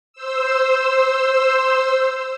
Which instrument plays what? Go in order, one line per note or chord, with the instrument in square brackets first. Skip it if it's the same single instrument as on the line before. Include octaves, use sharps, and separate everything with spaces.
[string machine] C5 E6